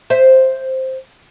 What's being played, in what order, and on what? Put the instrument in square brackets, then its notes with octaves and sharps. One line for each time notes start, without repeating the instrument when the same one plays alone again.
[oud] C5 E5